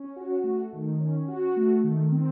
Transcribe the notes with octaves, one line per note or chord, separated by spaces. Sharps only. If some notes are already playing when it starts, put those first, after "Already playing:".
Already playing: C#4
F#4
A3
D#3
C#4
F#4
A3
D#3
C4